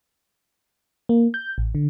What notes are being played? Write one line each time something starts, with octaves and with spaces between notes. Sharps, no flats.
A#3
G6
A1
D3